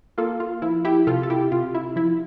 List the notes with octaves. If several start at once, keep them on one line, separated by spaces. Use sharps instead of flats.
A#3 F4 A4
F4
F3 E4
E4 G4
C3 F4 A4
A4
E4 G4
C3 F4
E4
F3 E4